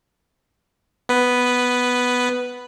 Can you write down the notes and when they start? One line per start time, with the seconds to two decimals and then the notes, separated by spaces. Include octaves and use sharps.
1.09 B3 B4